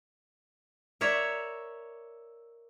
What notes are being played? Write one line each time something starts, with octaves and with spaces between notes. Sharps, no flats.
A#4 C#5 D5 E5